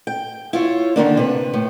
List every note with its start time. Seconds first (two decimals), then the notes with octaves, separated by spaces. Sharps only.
0.07 G5
0.53 E4 F4 C#5
0.96 D3 D#3 A#3 D4
1.17 C3 B4
1.54 A2